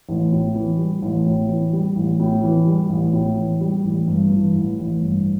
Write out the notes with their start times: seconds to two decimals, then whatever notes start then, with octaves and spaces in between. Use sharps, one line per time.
0.09 A1
0.32 A2
0.55 E3
0.78 G3
1.02 A1
1.26 A2
1.48 E3
1.73 G3
1.96 A1
2.20 A2
2.44 E3
2.67 G3
2.90 A1
3.13 A2
3.37 E3
3.61 G3
3.84 A1
4.08 G2
4.31 E3
4.55 A1
4.79 A1
5.02 G2